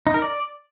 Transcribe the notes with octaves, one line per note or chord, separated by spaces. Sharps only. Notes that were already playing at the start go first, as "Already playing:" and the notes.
D#4
A#4
D5